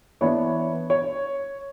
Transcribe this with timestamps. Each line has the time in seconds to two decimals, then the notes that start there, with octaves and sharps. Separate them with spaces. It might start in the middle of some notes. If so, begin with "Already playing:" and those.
0.21 E3 B3 D4 C#5
0.90 C#5